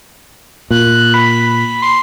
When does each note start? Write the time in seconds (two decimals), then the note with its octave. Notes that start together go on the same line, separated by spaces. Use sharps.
0.71 A#2 F#6
1.14 B5
1.82 C6